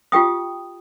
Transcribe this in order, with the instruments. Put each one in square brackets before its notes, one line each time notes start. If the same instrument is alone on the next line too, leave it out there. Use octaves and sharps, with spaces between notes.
[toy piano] F4 G4 G5 D#6